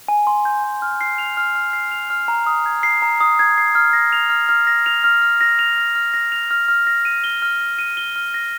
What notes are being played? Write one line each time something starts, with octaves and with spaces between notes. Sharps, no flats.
G#5
C6
G6
G#5
F6
C7
F7
F6
F6
C7
F7
F6
A#5
D#6
G#6
C7
A#5
D#6
G#6
C7
F6
A#6
F7
F6
F6
A#6
F7
F6
F6
A#6
F7
F6
F6
A#6
F7
F6
F6
A#6
D#7
G7
F6
A#6
D#7
G7
F6
A#6